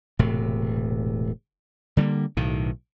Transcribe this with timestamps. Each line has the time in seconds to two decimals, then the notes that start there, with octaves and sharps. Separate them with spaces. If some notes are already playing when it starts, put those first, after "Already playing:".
0.19 E1 A2 C3
1.97 D3 G3 A3 A#3
2.37 B1 A2 D#3